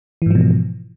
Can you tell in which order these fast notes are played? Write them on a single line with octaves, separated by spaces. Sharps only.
E3 G#2 F3 B2